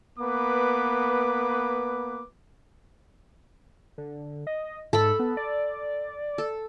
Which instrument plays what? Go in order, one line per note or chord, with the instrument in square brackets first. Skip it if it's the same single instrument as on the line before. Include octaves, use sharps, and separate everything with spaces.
[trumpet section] A#3 B3 B4 D6
[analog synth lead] D3
D#5
[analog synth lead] G#2 [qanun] A4 B5
[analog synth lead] B3
D5
[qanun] A4